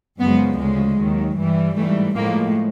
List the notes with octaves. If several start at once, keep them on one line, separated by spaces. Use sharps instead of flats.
F#2 C#3 F3 G#3 B3
D2 C#3 F3 G#3
D#2 D#3 F#3
G2 E3 G3
G#2 E3 G3 A3
A2 F3 G#3 A#3